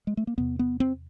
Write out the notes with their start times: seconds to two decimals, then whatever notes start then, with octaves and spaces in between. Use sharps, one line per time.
0.07 G#3
0.17 A3
0.27 A#3
0.38 E2 C3 B3
0.59 B3
0.80 C4